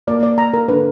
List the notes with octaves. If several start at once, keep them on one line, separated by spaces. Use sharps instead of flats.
A#3 D5
D5
A#5
A#4
D3 B4